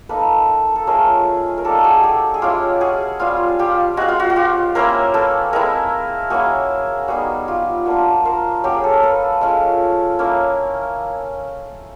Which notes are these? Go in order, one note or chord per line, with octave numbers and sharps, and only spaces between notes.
A#3 D#4 A4 B4
A4
F3 A3 C#4 G#4 A#4
A#4
G3 A#3 D#4 G4 A4
F#4 G#4 A4
G4 A4
G#4
G#3 C#4 E4 F4 G4
F#4 G#4
G3 C4 F4
F4 G4
G#3 C4 F4 F#4
F4
F#4
F#4
F4 G4
A#3 C#4 E4 A#4 C5
A4 B4
G#3 C4 E4 G#4 A#4
A#3 C#4 E4 F#4 G#4
G3 B3 D#4 F#4 G#4
F4 G4
A#3 D4 F4 F#4
A#4 C5
F#3 A#3 C#4 G4
G#4
A4
A#4
A4 B4
G#3 C#4 F4
A#3 C#4 E4